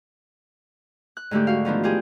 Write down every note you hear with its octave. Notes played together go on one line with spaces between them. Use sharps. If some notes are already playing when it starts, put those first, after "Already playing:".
F#6
G#2 D3 A3 G4
F#4 F5
D#3 F3 B3 D4
F4 G4 G#4